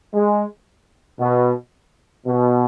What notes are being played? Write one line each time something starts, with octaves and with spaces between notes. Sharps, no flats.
G#3
B2
B2